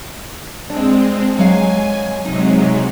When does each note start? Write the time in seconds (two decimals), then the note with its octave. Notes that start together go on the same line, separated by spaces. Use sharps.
0.70 G#3 C4 D4
1.38 F#3 G#3 F5 G#5
2.25 C3 F#3 G#3 D#4